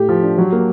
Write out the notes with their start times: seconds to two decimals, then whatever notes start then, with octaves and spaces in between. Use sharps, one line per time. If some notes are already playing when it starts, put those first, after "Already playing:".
Already playing: A2 A3 G4
0.09 F3
0.22 D4
0.38 F#3
0.52 A#3